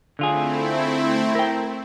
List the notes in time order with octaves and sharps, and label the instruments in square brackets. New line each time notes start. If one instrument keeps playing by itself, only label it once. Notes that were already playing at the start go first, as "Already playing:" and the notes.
[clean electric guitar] D3 F4 G#4 [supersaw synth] A3 C4 E4
[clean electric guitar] A#4 G5